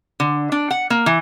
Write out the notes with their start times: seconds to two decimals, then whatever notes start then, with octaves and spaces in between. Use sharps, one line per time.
0.20 D3
0.52 D4
0.71 F#5
0.90 A#3
1.06 E3